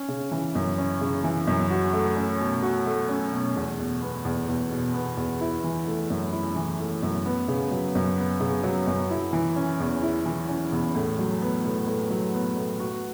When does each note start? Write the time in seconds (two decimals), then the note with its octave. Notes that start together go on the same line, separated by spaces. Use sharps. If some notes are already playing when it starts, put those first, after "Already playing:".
Already playing: C#4
0.08 C#3
0.31 E3
0.55 F#2
0.78 C#4
1.01 C#3
1.24 E3
1.48 F#2
1.70 F#4
1.93 A3
2.17 C#4
2.40 B2
2.63 F#4
2.86 A3
3.09 C#4
3.32 B2
3.56 E2
3.78 B2
4.02 B3
4.25 E2
4.48 E2
4.71 B2
4.94 B3
5.17 E2
5.41 E4
5.64 E3
5.87 A3
6.10 F#2
6.33 E4
6.56 E3
6.79 A3
7.03 F#2
7.26 B3
7.48 C#3
7.71 F#3
7.95 F#2
8.18 B3
8.40 C#3
8.63 F#3
8.87 F#2
9.10 E4
9.33 E3
9.56 C#4
9.80 E2
10.03 E4
10.26 E3
10.49 C#4
10.72 E2
10.95 A2
11.19 F#3
11.42 B3
11.64 A2
11.87 A2
12.10 F#3
12.34 B3
12.57 A2
12.79 F#4